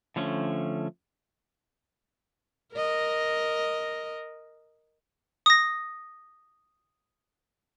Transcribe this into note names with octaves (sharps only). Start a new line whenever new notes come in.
D3 F3 A3 C#4
A#4 D#5
D#6 A#6